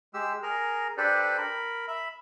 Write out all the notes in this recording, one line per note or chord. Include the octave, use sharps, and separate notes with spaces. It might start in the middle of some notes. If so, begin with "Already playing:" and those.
G#3 G4 E6
G#4 A#4 A#5
D4 G4 A4 B4 C5 D5
A#4 B5
E5 B5